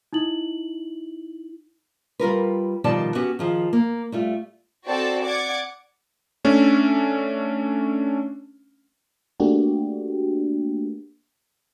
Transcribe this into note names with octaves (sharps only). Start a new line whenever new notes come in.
D#4 E4 F#7
G3 F4 A#4 B4
B2 D#3 F3 G3 D5 A5
B3 C#4 F#4 G4
D#3 F3 G#4
A#3
G3 A3 F4
C4 F#4 A4 D5 G5 A5
D5 F#5 D6 G#6
A3 C#4 D4
A3 A#3 D4 F#4 G4